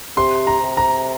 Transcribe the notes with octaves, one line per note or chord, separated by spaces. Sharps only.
C3 C6
A#5
C3
A#5